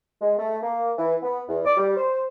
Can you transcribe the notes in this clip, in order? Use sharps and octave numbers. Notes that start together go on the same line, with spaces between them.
G#3
A3
A#3
E3
B3
E2
D5
G3
C5